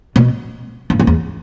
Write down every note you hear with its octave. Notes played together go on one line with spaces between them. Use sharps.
B2
G2
F#2
E2